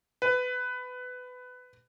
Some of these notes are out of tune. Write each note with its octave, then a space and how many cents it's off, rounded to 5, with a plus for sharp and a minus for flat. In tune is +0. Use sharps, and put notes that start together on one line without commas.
B4 +20